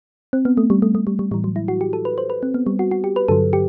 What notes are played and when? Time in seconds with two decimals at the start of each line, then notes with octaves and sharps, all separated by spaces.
0.33 C4
0.45 B3
0.57 A3
0.70 G3
0.82 A3
0.95 A3
1.07 G3
1.19 G3
1.31 A2 E3 G3
1.44 F#3
1.56 E4
1.68 F#4
1.81 G4
1.93 A4
2.05 B4
2.18 C5
2.30 B4
2.43 C4
2.54 B3
2.67 G3
2.79 F#4
2.91 F#4
3.04 G4
3.16 B4
3.28 G2 D3 F#3 A4
3.53 G4